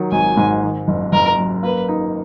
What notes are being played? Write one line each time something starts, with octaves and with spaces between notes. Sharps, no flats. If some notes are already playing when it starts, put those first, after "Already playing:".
Already playing: D#3 F#3
G#1 G#5
G#2
D#3
F#1
F#1 A#4
F#2
A#3 B4
D#4